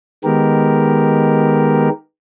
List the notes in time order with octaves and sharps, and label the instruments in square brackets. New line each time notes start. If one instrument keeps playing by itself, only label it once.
[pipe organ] D#3 G#3 B3 G4 A#4